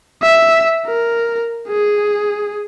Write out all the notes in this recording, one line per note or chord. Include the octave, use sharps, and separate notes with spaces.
E5
A#4
G#4